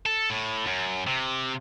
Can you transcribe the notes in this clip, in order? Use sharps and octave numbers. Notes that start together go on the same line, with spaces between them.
A4
A2
F#2
C3